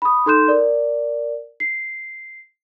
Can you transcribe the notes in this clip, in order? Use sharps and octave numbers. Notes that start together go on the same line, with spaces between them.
B5 D#6
D#4 A4 C6 F#6 G6 E7
A#4 D5
C7